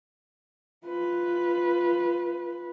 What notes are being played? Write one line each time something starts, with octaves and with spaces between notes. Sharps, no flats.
F4 B4